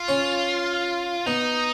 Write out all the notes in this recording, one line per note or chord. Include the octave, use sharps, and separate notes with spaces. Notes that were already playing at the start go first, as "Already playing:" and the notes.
Already playing: F4
C#4
B3 D#4